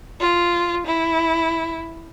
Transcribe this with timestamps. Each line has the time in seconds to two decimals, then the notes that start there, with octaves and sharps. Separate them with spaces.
0.20 F4
0.86 E4